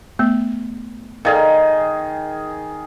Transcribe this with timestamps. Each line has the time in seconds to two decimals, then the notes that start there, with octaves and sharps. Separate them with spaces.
0.19 A3 B3
1.25 D#3 G#4 A4 D5 F5